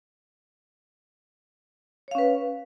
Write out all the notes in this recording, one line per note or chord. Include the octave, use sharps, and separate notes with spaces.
C#4 B4 C#5 F5